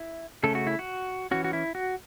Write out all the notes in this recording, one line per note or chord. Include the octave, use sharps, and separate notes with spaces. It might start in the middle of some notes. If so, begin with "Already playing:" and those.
Already playing: E4
C#3 A3 C#4 A4
F#4
E4
F#4
E3 C#4 F#4
F#4
E4
F#4